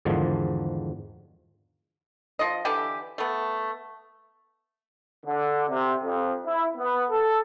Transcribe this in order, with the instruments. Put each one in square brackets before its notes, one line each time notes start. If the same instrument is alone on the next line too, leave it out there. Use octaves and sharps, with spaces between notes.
[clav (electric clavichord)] E2 G#2 D3 D#3 F3
[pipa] F3 D#5
D3 E3 G4
A3 B3
[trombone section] D3
C3
F2
E4
B3
A4